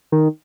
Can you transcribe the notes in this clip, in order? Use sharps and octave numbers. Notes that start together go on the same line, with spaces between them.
D#3